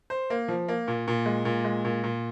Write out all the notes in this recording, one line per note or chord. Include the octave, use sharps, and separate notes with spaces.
C5
A#3
F3
A#3
A#2
A#2
G#3
A#2
G#3
A#2
A#2